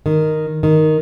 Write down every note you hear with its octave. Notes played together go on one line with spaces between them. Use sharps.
D#3
D#3